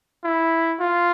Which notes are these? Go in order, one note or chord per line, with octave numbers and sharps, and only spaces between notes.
E4
F4